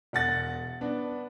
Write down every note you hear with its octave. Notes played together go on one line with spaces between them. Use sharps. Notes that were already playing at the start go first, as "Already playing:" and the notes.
E1 F#5 A6
B3 D4